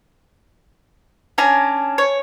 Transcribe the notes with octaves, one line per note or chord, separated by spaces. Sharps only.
C#4 D4 G#5 A#5
C#5